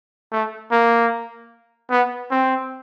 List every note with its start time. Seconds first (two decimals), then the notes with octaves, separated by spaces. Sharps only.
0.32 A3
0.72 A#3
1.91 B3
2.31 C4